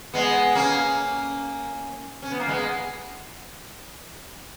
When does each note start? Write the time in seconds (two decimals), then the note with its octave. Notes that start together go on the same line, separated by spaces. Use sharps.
0.14 G#3 B3
0.55 A#3 C#4
2.22 C#4
2.32 B3
2.40 A#3
2.48 G#3 B3